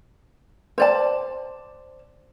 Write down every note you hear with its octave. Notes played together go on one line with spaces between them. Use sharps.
C5 D5 A5